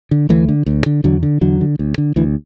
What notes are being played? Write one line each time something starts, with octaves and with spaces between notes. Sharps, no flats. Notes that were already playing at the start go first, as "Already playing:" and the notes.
D3
D2 E3 A3
D3
D2
D3
E2 D3 F#3
D3
E2 D3 F#3
D3
D2
D3
D2 E3